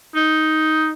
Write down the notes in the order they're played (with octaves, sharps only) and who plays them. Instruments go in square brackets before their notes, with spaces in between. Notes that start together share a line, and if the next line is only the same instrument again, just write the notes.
[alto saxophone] D#4